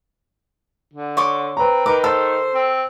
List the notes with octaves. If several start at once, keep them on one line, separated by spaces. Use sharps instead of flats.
D3
C#5 C6 D6
C4 B4 A#5
D#3 A#4 B4 D6
A4 C5 E6
C4